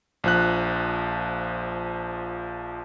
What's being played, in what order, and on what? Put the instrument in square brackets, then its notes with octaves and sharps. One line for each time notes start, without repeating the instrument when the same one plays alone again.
[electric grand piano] A#1 F3 F#6